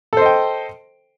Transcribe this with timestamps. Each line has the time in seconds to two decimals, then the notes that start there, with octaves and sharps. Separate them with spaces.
0.13 A4
0.17 C5
0.21 D#5
0.26 G5